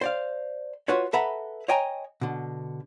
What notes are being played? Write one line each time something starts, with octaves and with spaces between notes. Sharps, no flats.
C5 D5 F5
F4 F#4 B4 C#5
A4 B4 E5 F#5 A#5 B5
C#5 D#5 G5 G#5 A#5
B2 D3